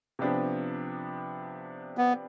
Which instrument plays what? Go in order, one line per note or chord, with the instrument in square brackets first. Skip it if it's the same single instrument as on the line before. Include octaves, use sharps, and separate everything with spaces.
[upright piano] C3 F3 B3 D4 G4
[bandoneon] B3